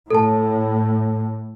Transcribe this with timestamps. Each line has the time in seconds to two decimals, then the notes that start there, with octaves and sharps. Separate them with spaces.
0.11 A2 A4 A5